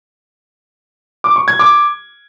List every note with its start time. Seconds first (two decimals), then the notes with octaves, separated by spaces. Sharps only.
1.24 D6
1.36 C#6
1.48 G#6
1.59 D6